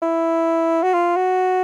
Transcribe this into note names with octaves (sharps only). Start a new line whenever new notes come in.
E4
F#4
F4
F#4